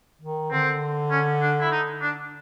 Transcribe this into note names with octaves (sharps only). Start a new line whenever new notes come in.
D#3
D3 C4
C#4
D4
E4
D#4
D4